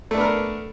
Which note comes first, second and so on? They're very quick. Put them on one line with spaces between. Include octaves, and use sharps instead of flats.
A3 D4 B3 A#4